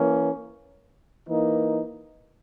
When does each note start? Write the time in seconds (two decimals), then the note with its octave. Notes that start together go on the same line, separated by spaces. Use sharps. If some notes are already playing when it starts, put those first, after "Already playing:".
Already playing: E3 A#3 C#4
1.28 E3 A#3 D#4